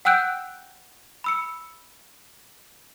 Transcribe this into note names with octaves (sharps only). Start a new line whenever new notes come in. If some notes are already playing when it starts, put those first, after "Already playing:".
F#5 G5 E6 F#6 G6 D7
B5 E6 C#7